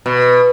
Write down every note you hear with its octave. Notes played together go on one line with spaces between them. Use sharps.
B2